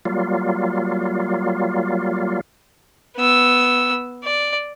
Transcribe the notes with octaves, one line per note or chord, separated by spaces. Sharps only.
F#3 G3 A#3 F4
B3 E6
D5